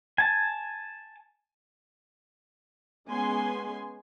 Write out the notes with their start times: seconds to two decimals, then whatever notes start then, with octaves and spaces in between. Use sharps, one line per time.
0.18 G#5 A5
3.08 G#3 B3 C#4 G#4 G#5 C6